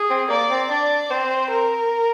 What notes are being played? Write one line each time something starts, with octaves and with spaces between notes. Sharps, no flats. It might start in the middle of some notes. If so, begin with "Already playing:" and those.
Already playing: G#4
C4
A#3 D5
C4
D4 D5
C4 C5
A#4